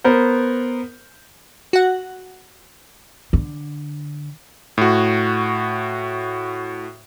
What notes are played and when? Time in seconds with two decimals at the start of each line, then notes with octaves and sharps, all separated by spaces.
0.04 B3 A#4 C5
1.73 F#4 F#5
3.33 D3
4.78 A2 F#4